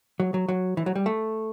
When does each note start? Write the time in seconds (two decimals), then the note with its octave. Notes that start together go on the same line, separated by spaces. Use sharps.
0.20 F#3
0.34 F#3
0.48 F#3
0.77 E3
0.86 F#3
0.96 G3
1.06 A3